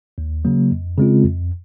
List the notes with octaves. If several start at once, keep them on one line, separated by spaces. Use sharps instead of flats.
D#2
C#3 F#3 A#3
F2
C#3 G#3 C4 F4
F2